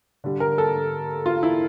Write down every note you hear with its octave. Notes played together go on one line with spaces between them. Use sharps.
D3 G3
A#4
A4
F4
E4